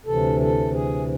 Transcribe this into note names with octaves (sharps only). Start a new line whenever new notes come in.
D2 C3 E3 A4
A4
G#4